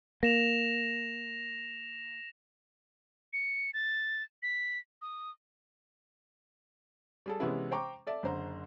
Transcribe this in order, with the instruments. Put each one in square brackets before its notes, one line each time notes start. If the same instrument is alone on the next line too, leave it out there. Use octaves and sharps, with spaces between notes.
[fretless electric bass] A#3 [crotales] A#6 E7 F7
[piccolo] C#7
A6
B6
D#6
[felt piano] G3 G#4 A4
C3 E3 G#3 B3 C#4 E4
C5 G5 A#5 C#6 D6
A4 D5 E5
F#1 D3 C5 A#5